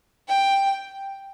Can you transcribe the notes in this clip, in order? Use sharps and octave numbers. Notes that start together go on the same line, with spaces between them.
G5